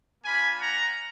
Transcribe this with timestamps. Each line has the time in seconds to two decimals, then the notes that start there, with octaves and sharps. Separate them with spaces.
0.24 A#3 D4 F4 G#5 B5
0.59 F#5 A#5